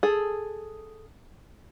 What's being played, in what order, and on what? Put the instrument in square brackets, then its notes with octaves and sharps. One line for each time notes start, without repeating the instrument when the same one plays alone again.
[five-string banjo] G#4 A4